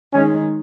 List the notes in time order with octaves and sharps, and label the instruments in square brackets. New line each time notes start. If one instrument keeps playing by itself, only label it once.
[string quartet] D#3 G#3 D#4 G#4 [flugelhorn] C#4